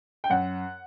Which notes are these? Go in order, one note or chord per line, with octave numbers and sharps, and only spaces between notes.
G5
F#2 F#5